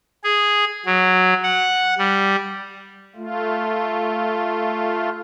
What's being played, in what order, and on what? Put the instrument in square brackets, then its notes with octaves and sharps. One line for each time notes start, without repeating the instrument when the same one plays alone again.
[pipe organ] G#4
F#3
F#5
G3
A3 F4